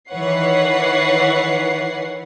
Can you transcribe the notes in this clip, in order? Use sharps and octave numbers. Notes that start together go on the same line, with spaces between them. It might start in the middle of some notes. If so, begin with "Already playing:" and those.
D#3 E3 B4 C#5 F#5 C7